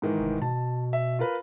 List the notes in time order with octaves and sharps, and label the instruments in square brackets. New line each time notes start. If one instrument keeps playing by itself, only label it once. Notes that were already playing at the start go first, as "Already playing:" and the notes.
[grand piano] G#2 D#3 E3
[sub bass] F1
[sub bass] B2 [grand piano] A5
[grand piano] E5
F4 A#4 B4